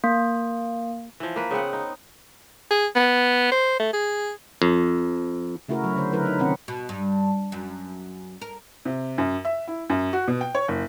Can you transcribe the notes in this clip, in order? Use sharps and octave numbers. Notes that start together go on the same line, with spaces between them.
A#3
E3 F3
A#3 B4
C#3 B3 C4 F#5
D#4
G#4
B3
C5
A3
G#4
F2
C#3 A3 E4 F#4 A#4
F#3
D3 C5
D3 F#3 E4 A#4 B4
D#4
C3 D#3 C4 C#4 F#5
B2
G2
F#2
A#4
C3
F#2
E5
E4
F#2
F#4
B2
G5
C#5
F#1